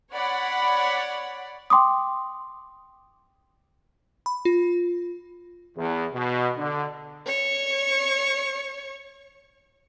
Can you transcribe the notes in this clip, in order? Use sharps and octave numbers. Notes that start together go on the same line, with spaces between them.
C#5 D5 F#5 B5
G5 C6 D6 D#6
B5
F4
E2
B2
D3
C#5 C#6